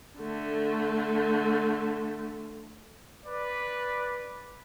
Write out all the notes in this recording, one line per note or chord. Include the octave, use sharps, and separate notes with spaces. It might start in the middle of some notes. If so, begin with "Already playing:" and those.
D3 A3
B4 D5